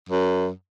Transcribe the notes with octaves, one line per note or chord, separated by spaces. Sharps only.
F#2